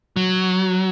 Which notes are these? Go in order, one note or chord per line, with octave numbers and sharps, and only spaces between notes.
F#3